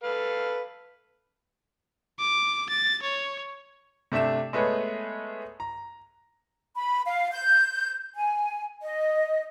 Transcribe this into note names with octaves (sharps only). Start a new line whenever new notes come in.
A4 B4 F5
D6
A6
C#5
C3 A3 D4 E5 E7
G#3 A3 B3 G#4 B4 C#5
A#5
B5
F5
G6
G#5
D#5